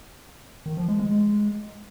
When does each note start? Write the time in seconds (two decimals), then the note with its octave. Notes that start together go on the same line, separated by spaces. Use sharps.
0.66 D#3
0.77 F3
0.88 G#3
1.00 G#3